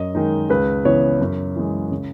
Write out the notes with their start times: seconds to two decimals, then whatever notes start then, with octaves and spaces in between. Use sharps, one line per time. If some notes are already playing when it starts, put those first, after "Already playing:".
Already playing: F#2 D#5
0.15 D#3 G#3 D#4
0.50 C#2 B4
0.85 C#3 E3 B3 E4 C#5
1.21 F#2
1.56 E3 G#3
1.91 C#3